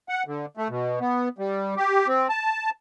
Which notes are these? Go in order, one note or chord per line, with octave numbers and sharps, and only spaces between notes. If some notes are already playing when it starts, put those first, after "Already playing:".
F#5
D3
A3
B2
B3
G3
G4
C4
A5